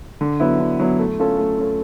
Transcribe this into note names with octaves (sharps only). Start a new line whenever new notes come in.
D3
F#3 B3 E4
D3
F#3 B3 E4
A3
C#4 F4 A4
A3
C#4 F4 A4